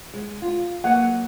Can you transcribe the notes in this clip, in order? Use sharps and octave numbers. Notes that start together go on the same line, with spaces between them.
G#3
F4
F#3 A#3 D#5 F#5